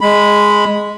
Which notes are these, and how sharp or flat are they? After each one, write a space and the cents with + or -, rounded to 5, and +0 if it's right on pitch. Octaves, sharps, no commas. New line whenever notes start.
G#3 +0 B5 +0